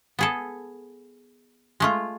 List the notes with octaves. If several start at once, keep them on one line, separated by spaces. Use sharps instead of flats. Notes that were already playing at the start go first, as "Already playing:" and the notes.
B3 G#4 A4
G#3 A3 F4